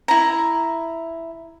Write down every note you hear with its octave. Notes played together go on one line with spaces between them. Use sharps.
E4 A#5